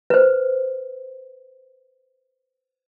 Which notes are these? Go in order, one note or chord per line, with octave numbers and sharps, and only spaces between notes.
B4 C5